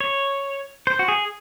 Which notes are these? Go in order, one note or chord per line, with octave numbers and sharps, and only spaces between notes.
C#5
C5
F#4
G#4